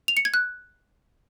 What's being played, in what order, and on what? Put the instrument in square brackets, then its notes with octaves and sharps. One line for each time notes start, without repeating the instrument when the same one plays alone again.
[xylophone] F7
C#7
G#6
F#6